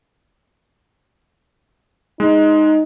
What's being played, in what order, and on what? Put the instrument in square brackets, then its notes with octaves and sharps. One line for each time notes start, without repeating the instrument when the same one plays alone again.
[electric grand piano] G#3 [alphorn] D#4